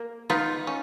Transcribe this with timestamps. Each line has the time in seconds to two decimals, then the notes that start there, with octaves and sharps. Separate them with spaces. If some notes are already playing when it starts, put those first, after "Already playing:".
Already playing: A#3
0.30 B3 D#4 F4
0.67 C#4